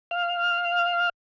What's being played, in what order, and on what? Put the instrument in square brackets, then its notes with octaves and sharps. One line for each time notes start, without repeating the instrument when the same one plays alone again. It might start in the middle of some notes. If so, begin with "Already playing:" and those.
[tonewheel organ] F5 F6